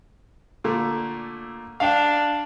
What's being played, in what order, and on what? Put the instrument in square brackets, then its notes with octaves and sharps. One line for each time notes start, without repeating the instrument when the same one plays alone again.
[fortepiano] A#2 D3 A3
[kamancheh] D4 [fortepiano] F5 G5